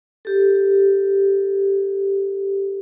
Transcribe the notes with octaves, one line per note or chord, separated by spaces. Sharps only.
G4 A4